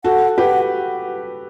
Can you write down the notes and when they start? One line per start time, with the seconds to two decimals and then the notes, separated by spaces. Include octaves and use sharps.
0.04 F#4 A4 F#5
0.38 G4 B4 F#5